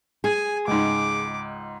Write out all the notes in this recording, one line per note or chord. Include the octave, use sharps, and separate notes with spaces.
G#4 G#5
C#2 G#2 D6